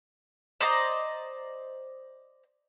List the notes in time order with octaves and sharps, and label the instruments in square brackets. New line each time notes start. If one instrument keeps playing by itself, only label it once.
[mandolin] C5 D5 D#5 A#5